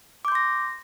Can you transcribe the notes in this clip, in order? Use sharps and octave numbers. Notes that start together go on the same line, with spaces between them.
C6 D6 G6 A#6